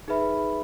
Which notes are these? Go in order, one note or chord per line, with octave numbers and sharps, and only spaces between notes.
D#4 G#4 B4 E5 B5